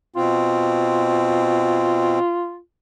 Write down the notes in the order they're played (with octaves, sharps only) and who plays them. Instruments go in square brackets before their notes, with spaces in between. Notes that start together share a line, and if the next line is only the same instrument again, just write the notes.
[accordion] B2 C4 [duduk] F4